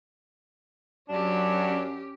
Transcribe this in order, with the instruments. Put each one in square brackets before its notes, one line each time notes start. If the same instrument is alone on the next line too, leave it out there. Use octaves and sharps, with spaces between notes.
[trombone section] F#2 F#3 [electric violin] C#4 G4 [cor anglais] D4